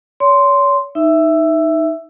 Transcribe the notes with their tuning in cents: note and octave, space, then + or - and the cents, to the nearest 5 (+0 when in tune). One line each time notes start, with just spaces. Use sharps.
C#5 +35 C6 -5
D#4 +0 E5 +0 E6 +10